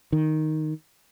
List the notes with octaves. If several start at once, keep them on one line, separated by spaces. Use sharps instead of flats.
D#3